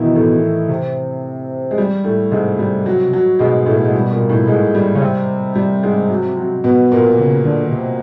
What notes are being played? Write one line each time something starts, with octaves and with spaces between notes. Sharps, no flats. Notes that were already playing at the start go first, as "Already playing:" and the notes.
Already playing: B2 D#3 E3 D#4 E4
A2 A3
C3
G#3
G3
A2 A3
G#2 C3 G#3
G3
F#3
F#3
G#2 B2 G#3
A2 A3
A3
G#3
G3
A#2 A#3
A2 A3
G#2 G#3
G3
C#3
C3
G3
G#2 G#3
F#3
F#3
B2 B3
A#2 A#3
C#3
D3
C3